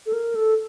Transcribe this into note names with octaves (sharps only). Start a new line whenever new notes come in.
A4
A#4
A4